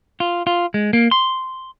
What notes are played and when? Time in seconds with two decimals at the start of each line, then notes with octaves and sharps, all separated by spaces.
0.20 F4
0.47 F4
0.74 G#3
0.93 A#3
1.11 C6